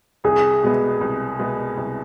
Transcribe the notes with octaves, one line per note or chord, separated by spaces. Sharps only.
C2 G#4
B2 G#3 B3
C2
B2 G#3 B3
C2